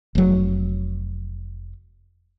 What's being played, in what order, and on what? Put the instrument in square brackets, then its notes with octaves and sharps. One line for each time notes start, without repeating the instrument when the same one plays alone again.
[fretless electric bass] F1 F#3